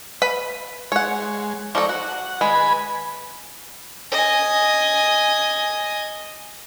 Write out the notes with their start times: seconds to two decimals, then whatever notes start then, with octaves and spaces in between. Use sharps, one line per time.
0.22 B4 B5
0.92 G#3 C#5 F#5
1.75 F3 A4 D5 A#5 C#6
1.89 F#4 F#5
2.41 G#3 B4 G#5 B5
4.12 D#5 G#5